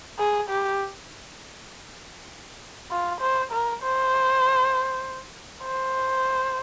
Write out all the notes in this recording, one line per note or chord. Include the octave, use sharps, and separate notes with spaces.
G#4
G4
F4
C5
A#4
C5
C5